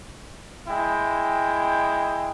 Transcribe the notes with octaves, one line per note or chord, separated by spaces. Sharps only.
G#3 E4 G5